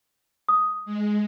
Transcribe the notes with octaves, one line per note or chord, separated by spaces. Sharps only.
D#6
G#3